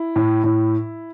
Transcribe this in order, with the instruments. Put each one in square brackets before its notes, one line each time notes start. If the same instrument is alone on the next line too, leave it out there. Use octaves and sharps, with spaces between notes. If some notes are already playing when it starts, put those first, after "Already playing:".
Already playing: [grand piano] E4
A2
A2